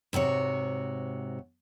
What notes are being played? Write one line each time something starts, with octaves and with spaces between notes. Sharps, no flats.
G#2 C3 F#4 C#5